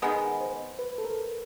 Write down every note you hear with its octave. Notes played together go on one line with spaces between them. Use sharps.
D#3 G#3 B3
C5
B4
A4
A#4